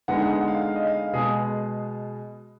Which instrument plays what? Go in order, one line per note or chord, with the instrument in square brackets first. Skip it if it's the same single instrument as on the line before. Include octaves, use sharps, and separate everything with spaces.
[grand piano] D3 G#3 B3 D#4 F#5
F#5
F#5
F5
F5
D#5
F5
B2 G#3 B3 G#4